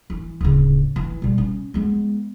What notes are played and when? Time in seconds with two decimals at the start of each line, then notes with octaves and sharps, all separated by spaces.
0.10 E3
0.41 D1 C#3
0.96 E3
1.22 B2 G3
1.38 C#4
1.74 G#3 B3